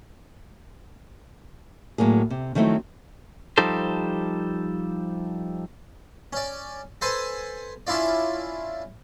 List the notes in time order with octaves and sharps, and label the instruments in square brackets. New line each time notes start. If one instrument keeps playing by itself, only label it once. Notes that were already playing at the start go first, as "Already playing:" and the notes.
[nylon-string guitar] A2 F#3 A#3 G#4
C3
D#3 F3 F#3 A3 C4 E4
[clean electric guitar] F3 G3 D#4 G4 A4 C5
[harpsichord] C#4 D5
A4 B4 C5 G#5 A5
C#4 D4 E4 F4 D5